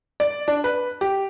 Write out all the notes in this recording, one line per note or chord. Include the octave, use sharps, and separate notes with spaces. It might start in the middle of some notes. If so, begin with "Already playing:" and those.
D5
D4
B4
G4